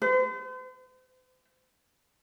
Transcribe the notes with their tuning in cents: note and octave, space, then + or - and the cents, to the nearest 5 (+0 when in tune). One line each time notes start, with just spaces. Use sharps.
C5 -45